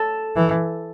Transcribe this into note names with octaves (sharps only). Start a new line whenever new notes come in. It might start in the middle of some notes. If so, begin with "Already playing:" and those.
Already playing: A4
E3